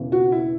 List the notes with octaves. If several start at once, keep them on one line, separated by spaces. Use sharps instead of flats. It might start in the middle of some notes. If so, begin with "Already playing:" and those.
Already playing: E1 E2 C#3 E3
F#4
E4